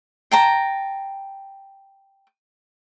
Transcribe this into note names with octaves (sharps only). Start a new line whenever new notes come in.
G5 A5 A#5